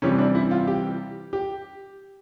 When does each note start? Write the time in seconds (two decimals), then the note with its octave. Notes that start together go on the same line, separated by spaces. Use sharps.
0.02 C3 E3 G3 C#4
0.18 D4
0.35 E4
0.51 F4
0.67 G4
1.33 G4